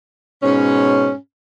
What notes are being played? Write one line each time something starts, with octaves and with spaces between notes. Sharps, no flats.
G#2 B2 C#4